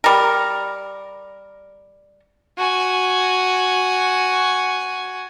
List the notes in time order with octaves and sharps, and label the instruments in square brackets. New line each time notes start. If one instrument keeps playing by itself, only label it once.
[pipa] G3 A#4
[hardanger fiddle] F#4 G#5